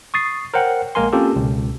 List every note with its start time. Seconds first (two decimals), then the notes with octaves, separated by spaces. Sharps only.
0.14 C#6 D#6 A6 C7
0.54 A#4 C5 C#5 F#5 G5
0.95 A#1 G#3 A#3 A#4 G#5 C6
1.13 A#3 C4 C#4 F4 G4 A4
1.36 C#2 B2